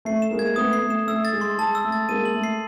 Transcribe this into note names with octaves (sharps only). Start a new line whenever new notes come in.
A3 C7
E7
G#3 A#3
G#6
A3 B3 D#6
C7
A3
E7
A3 E6
A6
G#3
C6
G#3 A5
E6
A3
A6
G#3 A#3 D#7
F#7
A3
C7